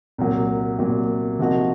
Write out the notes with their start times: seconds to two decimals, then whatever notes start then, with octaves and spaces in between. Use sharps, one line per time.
0.18 C2 A#2 F#3
0.79 C2 A#2 F#3
1.39 C3 F3 A#3 D#4 F#4